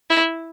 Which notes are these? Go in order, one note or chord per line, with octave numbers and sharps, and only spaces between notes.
E4